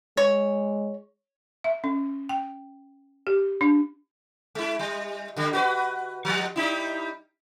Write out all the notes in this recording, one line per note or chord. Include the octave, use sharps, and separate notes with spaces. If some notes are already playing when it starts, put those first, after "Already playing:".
G#3 C#5
E5
C#4
G5
G4
D4
G#3 E4
G3
D3 G3
F#4 A4 B4
F3 G3
G3 D#4 E4